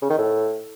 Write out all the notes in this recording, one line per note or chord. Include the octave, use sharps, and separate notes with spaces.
C#3
D#3
A2